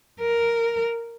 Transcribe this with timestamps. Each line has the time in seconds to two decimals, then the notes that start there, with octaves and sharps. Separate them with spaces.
0.21 A#4